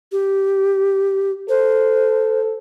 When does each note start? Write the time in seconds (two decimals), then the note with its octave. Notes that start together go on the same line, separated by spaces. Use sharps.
0.12 G4
1.49 A4 C5